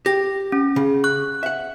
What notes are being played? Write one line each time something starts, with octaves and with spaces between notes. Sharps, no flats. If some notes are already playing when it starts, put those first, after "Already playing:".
G4 A#6
C#4
C#3
C#6 F#6
E5 F#5